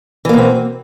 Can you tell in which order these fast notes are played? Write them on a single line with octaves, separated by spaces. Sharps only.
E3 A#3 B2 C4